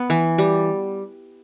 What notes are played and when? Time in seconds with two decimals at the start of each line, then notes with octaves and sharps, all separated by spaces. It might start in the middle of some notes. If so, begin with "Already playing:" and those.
Already playing: B3
0.10 E3
0.38 G3